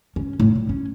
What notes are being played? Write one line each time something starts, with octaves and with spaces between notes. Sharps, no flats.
C#4
A2
A#2
C#4